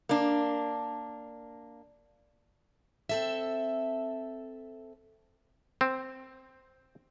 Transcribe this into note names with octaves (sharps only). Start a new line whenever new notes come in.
A#3 D4
C4 A4 E5
C4